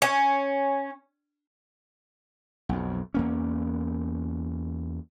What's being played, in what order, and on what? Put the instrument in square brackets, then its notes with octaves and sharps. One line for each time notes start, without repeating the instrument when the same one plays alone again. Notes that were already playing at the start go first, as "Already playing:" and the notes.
[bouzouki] C#4
[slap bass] B1 F2
E2 A#3 C#4